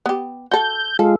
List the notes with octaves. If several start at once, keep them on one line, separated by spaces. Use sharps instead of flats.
B3 G4
F#4 A4 G6
G#3 F4 A4